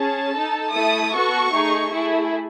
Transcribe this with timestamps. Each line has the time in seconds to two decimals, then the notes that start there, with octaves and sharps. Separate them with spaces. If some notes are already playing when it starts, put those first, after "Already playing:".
Already playing: C#4 G#4 A5
0.33 D#4 A4
0.73 A3 E4 A4 D#6
1.13 B3 F#4 A4 C#6
1.52 A3 D#4 G#4
1.92 A3 E4 G#4